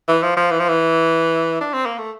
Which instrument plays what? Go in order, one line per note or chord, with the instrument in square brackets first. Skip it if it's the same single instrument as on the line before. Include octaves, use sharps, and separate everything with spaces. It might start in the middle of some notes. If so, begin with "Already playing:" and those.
[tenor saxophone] E3
F3
F3
E3
F3
E3
D4
C4
A#3
A3